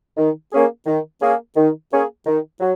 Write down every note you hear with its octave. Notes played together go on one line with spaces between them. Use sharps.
D#3
A#3 C#4 G#4
D#3
A#3 C#4 G#4
D#3
A#3 C#4 G#4
D#3
F#3